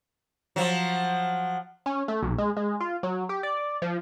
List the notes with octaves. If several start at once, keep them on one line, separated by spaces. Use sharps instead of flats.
F3 F#3
C#4
A3
B1
G#3
G#3
F4
F#3
G4
D5
F3